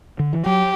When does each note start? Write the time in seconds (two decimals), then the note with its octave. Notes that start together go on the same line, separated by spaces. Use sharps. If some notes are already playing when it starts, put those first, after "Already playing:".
0.19 D3
0.33 E3
0.46 F#3 G4